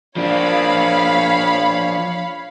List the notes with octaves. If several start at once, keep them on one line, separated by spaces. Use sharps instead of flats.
F3 D4 C#5 F5 B5